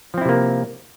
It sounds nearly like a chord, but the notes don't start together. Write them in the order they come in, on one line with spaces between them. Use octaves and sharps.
F3 C4 E4 C3 A#3